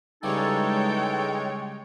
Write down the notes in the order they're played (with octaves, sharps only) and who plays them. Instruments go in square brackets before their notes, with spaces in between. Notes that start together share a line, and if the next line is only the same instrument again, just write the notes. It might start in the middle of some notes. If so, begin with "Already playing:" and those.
[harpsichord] C#3 G3 [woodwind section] E3 D#4 A4 [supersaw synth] G#3 C#5 [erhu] G5